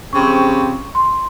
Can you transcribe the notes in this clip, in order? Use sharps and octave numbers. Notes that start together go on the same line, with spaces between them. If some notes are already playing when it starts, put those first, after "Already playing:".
C#3 F3 C4 G4 C#6
C6